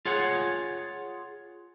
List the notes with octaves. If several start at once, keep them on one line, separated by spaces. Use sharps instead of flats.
F4 G#4 C#5 F#5